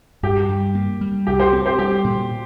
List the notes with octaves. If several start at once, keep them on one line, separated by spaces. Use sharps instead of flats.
G2 G4
G2
A#3
G3
C2 G4
G4 C5
C4
G4 C5
G3 G4
A#2